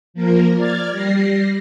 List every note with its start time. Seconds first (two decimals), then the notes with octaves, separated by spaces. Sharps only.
0.14 F3 A#3 A#4
0.56 D5 F6 G#6 A6
0.91 G3 A#6 C7